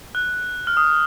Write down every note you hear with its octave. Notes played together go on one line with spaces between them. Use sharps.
F#6
F6
D#6